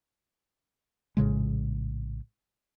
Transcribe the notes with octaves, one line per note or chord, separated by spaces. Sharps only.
A#1 A2 C#3 G#3